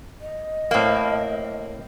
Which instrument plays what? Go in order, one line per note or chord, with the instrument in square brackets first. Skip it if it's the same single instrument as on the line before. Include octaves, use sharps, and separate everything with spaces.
[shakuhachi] D#5
[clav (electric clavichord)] A2 F5 [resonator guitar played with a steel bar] A#3 C4